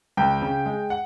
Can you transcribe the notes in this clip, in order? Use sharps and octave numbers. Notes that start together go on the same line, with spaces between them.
C#2 G5
C#3
G#3
F#5